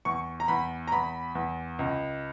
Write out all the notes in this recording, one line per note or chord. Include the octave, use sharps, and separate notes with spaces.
E2 C#6
A#5
E2 B5
A#5
E2 B5
E2
C#2